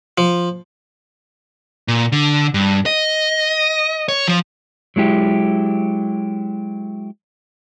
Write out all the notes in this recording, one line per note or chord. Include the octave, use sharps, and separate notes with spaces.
F3
A#2
D3
G2
D#5
C#5
F3
F#3 G#3 E4 G4